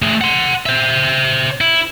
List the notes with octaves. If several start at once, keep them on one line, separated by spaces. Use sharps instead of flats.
A3 G#4
F#5 C6
C5 E5
E4